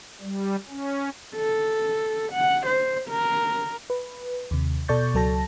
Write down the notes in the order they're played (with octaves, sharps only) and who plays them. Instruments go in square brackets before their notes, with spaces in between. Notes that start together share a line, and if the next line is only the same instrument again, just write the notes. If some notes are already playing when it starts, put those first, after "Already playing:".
[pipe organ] G3
C#4
[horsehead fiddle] A4
F#5
C5
A#4
[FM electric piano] B4
D#2 C3
B2 A4 D5 C#6 G6 A6
C#2 F#3 A4 A5 A#6